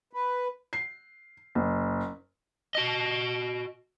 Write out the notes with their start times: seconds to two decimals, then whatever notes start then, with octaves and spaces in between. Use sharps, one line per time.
0.13 B4
0.73 C7
1.55 F#1
2.75 F#4 D#5